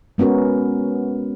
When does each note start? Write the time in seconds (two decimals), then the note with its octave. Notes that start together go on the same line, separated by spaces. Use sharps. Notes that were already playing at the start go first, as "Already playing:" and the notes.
0.18 G#3 B3 C#4 F#4 A#4